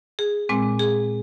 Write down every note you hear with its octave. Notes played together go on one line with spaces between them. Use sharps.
G#4
A#2 G#3 C4
G#4